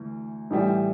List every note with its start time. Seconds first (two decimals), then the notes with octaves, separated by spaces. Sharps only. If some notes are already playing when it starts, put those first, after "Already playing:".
Already playing: D2 E3
0.51 A1 A2 E3 G3